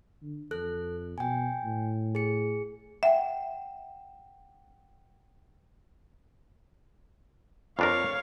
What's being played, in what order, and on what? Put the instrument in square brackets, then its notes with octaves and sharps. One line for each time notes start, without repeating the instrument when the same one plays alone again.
[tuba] D3
[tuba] F2 [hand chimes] A4 F#6
[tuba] B2 [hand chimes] G5 G#5
[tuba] A2
[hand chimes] G#4 C#7
[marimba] E5 [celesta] F#5 G5
[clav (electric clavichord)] F2 D4 A#4 [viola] C#5 F5